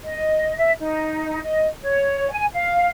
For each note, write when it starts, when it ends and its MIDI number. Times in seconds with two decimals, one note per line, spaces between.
0.04 0.53 75
0.56 0.71 76
0.80 1.39 63
1.43 1.67 75
1.82 2.30 73
2.31 2.45 80
2.53 2.90 77